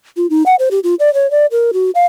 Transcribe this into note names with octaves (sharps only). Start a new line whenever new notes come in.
F4
D#4
F#5
C5
G4
F4
D5
C#5
D5
A#4
F#4
F5